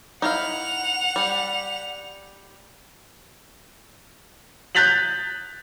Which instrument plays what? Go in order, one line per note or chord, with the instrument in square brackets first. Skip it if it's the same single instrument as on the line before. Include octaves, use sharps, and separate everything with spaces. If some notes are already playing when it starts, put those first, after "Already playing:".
[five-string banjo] D#4 E4 F5 [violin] F#5 F7
[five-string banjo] G3
[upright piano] F#6 G6 A6 B6 F7 F#7